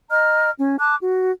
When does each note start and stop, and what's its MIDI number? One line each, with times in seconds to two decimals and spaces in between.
0.10 0.50 75
0.10 0.50 82
0.10 0.50 89
0.58 0.79 61
0.79 0.96 81
0.79 0.96 86
0.79 0.96 90
1.00 1.31 66